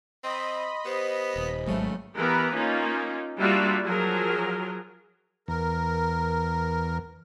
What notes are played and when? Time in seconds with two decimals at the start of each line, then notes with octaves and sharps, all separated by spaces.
0.24 C4 D#5 B5 C6
0.85 B3 G4 C5
1.36 D#1
1.67 G#1 C#3 F#3 G#3 A3
2.17 E3 B3 G4 A#4 B4
2.56 A#3 C#4 D#4 F4
3.39 G3 A#3 D4 F4 F#4 E5
3.85 F3 F#3 G#4 A#4
5.48 E2 A#4